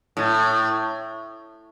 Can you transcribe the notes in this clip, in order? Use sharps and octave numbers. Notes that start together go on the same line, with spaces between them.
A2